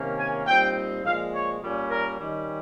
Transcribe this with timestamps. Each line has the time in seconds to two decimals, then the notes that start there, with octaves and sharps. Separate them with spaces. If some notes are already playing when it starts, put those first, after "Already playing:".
Already playing: C3 D#3 A#3 C#4
0.18 G#5
0.46 A#2 G3 C4 D#4 G5
1.04 A#2 F3 G#3 F5
1.33 C#5
1.61 A#2 G3 C#4
1.90 A#4
2.19 D#3 G3 C#4